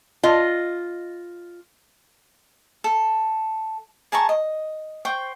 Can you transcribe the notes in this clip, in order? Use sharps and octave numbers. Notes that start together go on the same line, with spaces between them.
F4 D#5
A4
G#4 A5 A#5 C#6
D#5
C5 G5 C#6